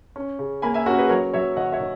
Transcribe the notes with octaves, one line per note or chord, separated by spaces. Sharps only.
C#4
C#3
A#3 G#5 B5
E5 G#5
C#4 F#4 A#4
G#4 B4
F#3 A#4 C#5
F#3 C#5 E5
D#3 D#5 F#5
C#5 E5
D#3